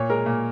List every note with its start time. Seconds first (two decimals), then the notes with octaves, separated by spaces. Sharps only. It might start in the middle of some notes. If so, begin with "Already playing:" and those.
Already playing: A#2 C#5
0.10 G#3 A#4
0.26 A#2